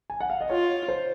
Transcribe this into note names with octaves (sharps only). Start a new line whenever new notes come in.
G#5
F#5
F5
D#5
F4 C#5
C5